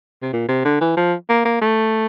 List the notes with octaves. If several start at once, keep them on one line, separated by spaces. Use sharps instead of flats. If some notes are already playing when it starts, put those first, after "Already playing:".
C3
A#2
C3
D3
E3
F3
A#3
A#3
A3